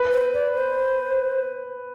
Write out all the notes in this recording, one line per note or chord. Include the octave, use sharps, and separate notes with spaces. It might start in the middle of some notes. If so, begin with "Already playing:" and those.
Already playing: B4
C5
D5
C5